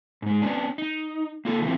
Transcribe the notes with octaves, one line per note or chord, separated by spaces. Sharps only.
G#2 G#3
B3 C#4 D4
D#4
A#3 F4 A4
D3 E3 F3 C4 E4 F4